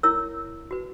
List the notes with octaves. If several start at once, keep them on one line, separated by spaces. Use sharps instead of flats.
E4 A#4 C#5 E6
F#4 B4